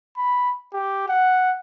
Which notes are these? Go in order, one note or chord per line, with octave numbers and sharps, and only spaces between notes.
B5
G4
F#5